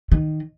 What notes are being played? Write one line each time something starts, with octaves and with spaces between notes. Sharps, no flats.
D#3